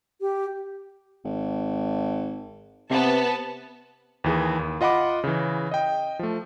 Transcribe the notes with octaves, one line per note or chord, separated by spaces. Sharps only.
G4
G#1
C3 B3 A5
D#2 E3 G#4
D#2
F4 D#5 F#5 B5 D6
C#3 E3
D#5 G5
F3 A3